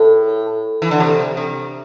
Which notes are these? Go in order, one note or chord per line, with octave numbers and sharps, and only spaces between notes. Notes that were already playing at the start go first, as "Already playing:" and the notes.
Already playing: A2
E3
D3
C3
C3